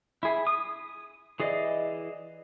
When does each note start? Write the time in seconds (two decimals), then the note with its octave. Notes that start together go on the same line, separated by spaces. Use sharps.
0.23 E4 G#4
0.47 D#6
1.40 E3 G#4 D5 D#5